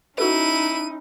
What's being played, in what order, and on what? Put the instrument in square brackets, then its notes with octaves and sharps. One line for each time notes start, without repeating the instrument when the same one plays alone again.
[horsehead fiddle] C#4 D#4 [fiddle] E4 [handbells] F#4 A4 B4 [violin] D#7